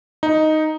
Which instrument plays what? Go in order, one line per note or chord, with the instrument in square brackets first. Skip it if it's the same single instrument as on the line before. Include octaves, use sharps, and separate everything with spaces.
[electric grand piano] D#4